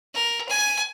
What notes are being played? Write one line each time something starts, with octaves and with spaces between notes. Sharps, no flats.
A#4
G#5